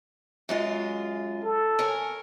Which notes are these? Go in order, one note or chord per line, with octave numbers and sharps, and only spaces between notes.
F#2 G#3 F4
A4
A#4 C#5 G#5